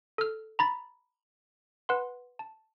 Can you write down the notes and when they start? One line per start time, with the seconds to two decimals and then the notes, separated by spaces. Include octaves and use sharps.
0.18 A4 F6
0.59 A#5 B5 A6 B6
1.89 B4 F#5 C6
2.39 A5